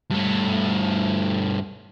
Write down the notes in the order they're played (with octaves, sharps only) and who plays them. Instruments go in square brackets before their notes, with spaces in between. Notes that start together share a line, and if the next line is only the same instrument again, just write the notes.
[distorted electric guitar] G2 A3